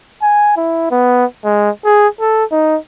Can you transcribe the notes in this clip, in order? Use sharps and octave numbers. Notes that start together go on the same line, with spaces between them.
G#5
E4
B3
G#3
G#4
A4
D#4